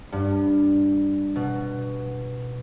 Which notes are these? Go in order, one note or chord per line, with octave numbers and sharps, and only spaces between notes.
G2
B2